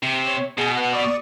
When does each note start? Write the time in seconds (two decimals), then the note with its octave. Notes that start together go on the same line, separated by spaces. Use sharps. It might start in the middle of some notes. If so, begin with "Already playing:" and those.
0.02 C3
0.25 C#5
0.58 B2 G#4
0.76 B3 F#5
0.93 D5 C#6 D#6